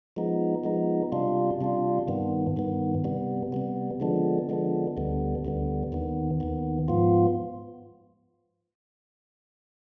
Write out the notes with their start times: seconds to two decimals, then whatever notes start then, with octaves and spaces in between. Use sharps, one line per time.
0.16 F3 G#3 B3 D#4
0.64 F3 G#3 B3 D#4
1.12 C3 G3 D4 F4
1.61 C3 G3 D4 F4
2.08 G2 D#3 B3
2.56 G2 D#3 B3
3.04 C3 G3 B3
3.52 C3 G3 B3
4.00 D3 F3 G#3 B3 D4
4.49 D3 F3 G#3 B3 D4
4.97 D2 D3 G3 B3
5.45 D2 D3 G3 B3
5.92 D#2 D#3 B3
6.40 D#2 D#3 B3
6.88 G#2 F3 B3 F4